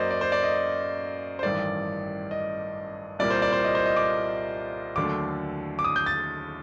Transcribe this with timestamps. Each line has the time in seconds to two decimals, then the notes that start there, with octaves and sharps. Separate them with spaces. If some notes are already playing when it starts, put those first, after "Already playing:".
Already playing: F#2 F#3 A#3 C5 D5 D#5
0.10 D5
0.21 C5
0.32 D5
0.43 D#5
1.39 C5
1.43 A1 G2 D#3 D5
2.31 D#5
3.19 C2 A#2 G3 A#3 D5
3.30 C5
3.42 D5
3.52 C5
3.64 D#5
3.75 C5
3.86 D#5
3.96 D6
4.96 D#2 D3 F#3 A3 D6
5.79 D6
5.84 D#6
5.96 G6
6.06 A6